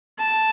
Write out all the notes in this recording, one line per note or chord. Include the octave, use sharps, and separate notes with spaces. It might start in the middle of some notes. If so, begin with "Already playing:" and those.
A5